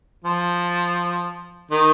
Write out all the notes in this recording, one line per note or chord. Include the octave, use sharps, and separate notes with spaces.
F3
D#3